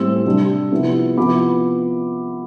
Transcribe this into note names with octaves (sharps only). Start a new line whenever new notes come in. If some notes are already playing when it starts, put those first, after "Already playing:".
Already playing: A2 G3 C4 C6 E6
C3 G3 D4
C3 F3 B3 E4
C3 F3 B3 E4 B5 D6